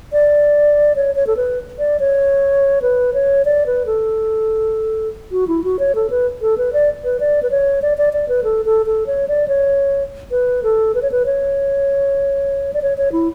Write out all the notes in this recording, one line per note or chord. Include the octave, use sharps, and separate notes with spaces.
D5
C#5
C#5
A4
B4
D5
C#5
B4
C#5
D5
B4
A4
F#4
E4
F#4
C#5
A4
B4
A4
B4
D5
B4
D5
B4
C#5
D5
D5
D5
B4
A4
A4
A4
C#5
D5
C#5
B4
A4
B4
C#5
B4
C#5
D5
C#5
C#5
E4